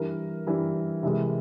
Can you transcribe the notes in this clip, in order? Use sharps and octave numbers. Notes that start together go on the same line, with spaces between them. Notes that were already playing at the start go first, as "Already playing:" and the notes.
Already playing: G2 E3 G3 A#4
G2 E3 G3
C3 E3 G#3